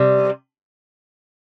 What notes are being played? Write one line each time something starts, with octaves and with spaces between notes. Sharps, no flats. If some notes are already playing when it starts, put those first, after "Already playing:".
Already playing: C3 G3